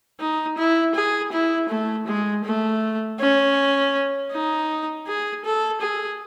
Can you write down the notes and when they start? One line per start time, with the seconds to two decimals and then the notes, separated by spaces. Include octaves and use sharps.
0.20 D#4
0.58 E4
0.95 G#4
1.32 E4
1.69 A3
2.07 G#3
2.45 A3
3.20 C#4
4.32 D#4
5.07 G#4
5.45 A4
5.81 G#4